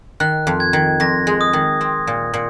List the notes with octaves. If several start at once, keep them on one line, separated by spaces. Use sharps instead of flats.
D#3 F#6
F2
G#6
D#3
F2 A#6
G#3
D#6
D#3
C4
A#2
A#2